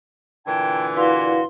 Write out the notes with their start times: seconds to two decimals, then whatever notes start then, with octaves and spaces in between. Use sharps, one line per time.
0.47 A#2 D3 E3 G5 A5 G#6
0.96 E4 F#4 B4 D5 F5 C6